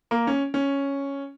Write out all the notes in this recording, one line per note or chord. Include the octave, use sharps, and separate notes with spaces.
A#3
C#4
C#4